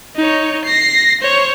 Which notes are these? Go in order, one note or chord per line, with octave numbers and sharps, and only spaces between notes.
D#4 C#5
A#6 C7
C5 C#5